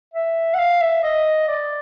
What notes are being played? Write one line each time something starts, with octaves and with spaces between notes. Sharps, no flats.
E5
F#5
F5
E5
D#5
D5